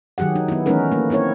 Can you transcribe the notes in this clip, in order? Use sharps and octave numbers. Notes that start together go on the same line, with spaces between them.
D#3 F#3 G4 G#4 F#5
D#4
B3 E4
E3 A3 C#4 D#4 A#4 B4
A3 A#3
A#3 C4 E4 A#4 C#5